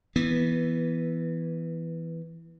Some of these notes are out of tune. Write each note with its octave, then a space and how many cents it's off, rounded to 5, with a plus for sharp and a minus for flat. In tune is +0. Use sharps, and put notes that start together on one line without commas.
E3 +0 B3 -15